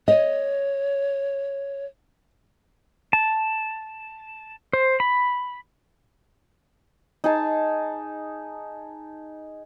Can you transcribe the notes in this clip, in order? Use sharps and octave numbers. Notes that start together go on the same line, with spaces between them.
C#5 D#5
A5
C5
B5
D#4 G#4 A5